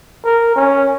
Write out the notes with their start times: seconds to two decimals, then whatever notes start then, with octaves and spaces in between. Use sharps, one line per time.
0.24 A#4
0.56 C#4